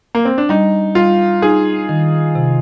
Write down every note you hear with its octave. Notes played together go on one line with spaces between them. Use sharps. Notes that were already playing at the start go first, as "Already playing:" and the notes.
A#3
C4
D4
G3 D#4
G3 F4
D#4 G#4
D#3
C3